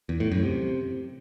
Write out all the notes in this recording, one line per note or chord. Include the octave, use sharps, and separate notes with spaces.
E2
A2
F#2
C3